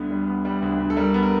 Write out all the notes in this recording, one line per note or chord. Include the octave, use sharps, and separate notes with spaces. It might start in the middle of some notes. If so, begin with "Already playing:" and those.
Already playing: D2 D3 G3 B3 B4
G3
B3
G3
D2
D2
A4
G3 A#4
B3
A#4